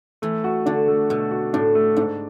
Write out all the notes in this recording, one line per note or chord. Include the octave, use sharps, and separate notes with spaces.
E3 A3
F#4
D3 D4
A3
B2 A3
F#4
A2 D4
A3
G#2 D4